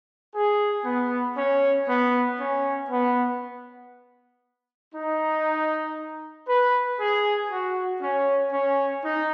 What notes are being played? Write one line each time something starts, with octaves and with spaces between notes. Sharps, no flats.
G#4
B3
C#4
B3
C#4
B3
D#4
B4
G#4
F#4
C#4
C#4
D#4